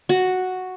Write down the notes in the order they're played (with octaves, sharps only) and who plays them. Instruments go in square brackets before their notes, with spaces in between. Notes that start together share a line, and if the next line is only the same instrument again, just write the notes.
[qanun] F#4